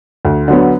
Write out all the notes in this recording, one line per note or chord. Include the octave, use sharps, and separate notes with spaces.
D2
D3 F#3 B3